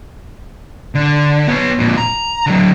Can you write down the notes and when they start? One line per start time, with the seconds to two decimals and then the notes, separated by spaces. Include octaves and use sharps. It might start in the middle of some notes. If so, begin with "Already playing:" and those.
0.95 D3
1.48 B3 C#5
1.79 F2 A#2
1.98 A#5
2.47 D3 F#3